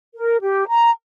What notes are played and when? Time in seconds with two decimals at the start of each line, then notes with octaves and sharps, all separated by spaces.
0.15 A#4
0.41 G4
0.68 A#5